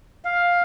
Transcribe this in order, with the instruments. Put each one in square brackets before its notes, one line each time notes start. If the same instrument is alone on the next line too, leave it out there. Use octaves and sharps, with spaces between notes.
[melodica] F5